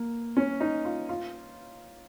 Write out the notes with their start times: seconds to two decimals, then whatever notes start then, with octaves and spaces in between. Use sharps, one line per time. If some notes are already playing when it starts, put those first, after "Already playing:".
Already playing: A#3
0.37 C#4
0.60 D#4
0.85 F4
1.09 F4